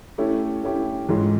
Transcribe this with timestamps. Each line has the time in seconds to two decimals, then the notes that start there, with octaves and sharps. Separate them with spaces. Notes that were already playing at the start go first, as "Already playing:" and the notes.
0.18 A3 C#4 E4 G4
0.63 A3 C#4 E4 G4
1.09 G#2 E3 G#3 C#4 F4